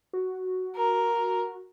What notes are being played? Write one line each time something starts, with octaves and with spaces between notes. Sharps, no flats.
F#4
A#4